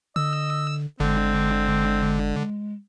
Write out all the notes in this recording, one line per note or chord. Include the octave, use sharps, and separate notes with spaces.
D3 D#5 E6
G1 D3 G#3 C4